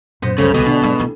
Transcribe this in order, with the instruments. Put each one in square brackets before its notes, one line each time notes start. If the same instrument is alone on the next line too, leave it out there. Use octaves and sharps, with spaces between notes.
[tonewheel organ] F#2 C5 [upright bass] A#2 [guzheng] B3 B4 D#5
[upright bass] C2 [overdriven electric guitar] C#3 [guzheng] A3 B3 G4
[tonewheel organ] D2 D#6 [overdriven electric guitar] B2 [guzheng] G4 D#5 G#5
[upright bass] D3 [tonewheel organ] D4
[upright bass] G2 G#3
D4 E4